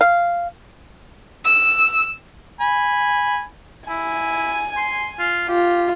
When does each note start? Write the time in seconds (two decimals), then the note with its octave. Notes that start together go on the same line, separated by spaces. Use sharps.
0.01 F5
1.45 E6
2.61 G#5 B5
3.89 E4 G#5
4.77 C6
5.19 F4
5.49 F4 G4